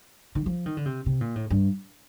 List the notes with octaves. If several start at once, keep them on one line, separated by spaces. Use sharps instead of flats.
D#3
F3
D#3
D3
C3
C3
A#2
A2
G2